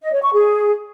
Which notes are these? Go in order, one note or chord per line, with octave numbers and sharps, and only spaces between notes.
D#5
C#5
C#6
G#4